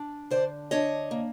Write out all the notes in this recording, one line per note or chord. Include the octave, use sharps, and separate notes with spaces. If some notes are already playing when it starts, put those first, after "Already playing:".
Already playing: D4
D3 C5 D5
D4 C#5 D#5
A#3